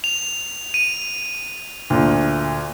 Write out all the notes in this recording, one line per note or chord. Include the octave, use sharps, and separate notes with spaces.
F7
D#7
D2 A#2